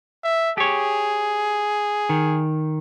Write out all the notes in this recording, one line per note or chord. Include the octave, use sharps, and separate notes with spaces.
E5
G4 G#4 C#5
D#3